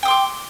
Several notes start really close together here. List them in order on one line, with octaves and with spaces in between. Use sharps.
G5 D#6 C6 D6